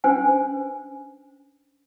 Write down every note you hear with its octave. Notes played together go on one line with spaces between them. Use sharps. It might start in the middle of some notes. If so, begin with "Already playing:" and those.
C#4 D4 B4 C5 G5 G#5